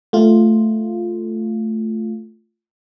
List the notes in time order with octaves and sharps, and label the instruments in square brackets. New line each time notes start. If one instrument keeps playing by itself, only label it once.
[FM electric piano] A3 F4